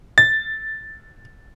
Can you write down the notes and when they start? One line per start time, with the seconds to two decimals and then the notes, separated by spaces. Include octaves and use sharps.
0.18 A6